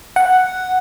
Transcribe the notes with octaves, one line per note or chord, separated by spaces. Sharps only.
F#5